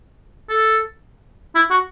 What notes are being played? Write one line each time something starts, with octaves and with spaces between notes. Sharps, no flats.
A4
E4
F#4